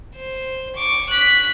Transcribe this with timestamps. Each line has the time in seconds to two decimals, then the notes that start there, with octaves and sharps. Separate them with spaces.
0.16 C5
0.77 C#6 D6
1.10 F#6 B6